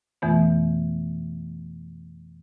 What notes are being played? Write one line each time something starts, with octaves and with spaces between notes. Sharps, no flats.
F2 B2 E3 A3 B3